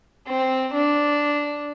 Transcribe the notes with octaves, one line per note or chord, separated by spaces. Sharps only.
C4
D4